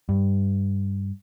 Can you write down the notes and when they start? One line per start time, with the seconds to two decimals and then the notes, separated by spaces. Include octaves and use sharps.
0.09 G2